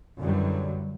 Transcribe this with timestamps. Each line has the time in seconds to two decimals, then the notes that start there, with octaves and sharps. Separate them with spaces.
0.19 F#2 D3 E3 F#3 G3